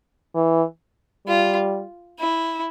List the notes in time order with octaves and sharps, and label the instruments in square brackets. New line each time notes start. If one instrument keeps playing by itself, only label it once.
[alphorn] E3
[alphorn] G3 [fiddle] F4
[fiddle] E4